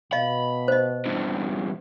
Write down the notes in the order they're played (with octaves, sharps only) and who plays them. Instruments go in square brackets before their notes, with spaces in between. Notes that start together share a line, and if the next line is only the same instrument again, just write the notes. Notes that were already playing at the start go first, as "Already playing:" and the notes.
[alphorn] B2 [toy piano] D#5 F5 [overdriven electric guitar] B5
[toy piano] C5 D#5
[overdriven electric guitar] E2 G2